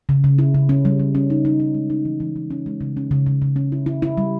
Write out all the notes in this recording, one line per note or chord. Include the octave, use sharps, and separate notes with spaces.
C#3
C#3
E4
C#3
C#4
G3
G3
C#4
D#4
D#4
D#4
G#3
D#4
E3
E3
E3
C#4
G#3
C#3
C#4
C#3
C#3
C#3
C#4
E4
E4
E4
G3